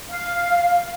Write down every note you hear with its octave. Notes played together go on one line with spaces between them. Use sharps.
F5